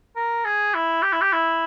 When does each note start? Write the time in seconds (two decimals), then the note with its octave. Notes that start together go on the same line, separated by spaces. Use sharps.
0.16 A#4
0.45 G#4
0.74 E4
1.03 G4
1.12 E4
1.21 G4
1.32 E4